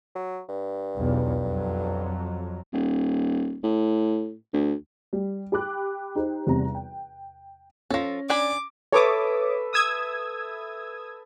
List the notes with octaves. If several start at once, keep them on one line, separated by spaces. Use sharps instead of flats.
F#3
G2
B1 E2
F2 F#3
D#1
A2
D2
G3
G4 G5 B5 D6 F#6
D#4 G4 C5
E2 C3 G3 A#5
G5
F3 C#4 A4 A#6
D4 D5 G#5 B5 D6
A4 B4 C#5 E5 D6 D#6
D#6 E6 G#6